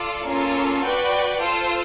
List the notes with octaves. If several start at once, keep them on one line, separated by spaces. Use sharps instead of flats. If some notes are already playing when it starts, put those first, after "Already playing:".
Already playing: F4 A4 D5
A#3 C#4 F4 A4
F#4 B4 D5 G5
F4 A4 C5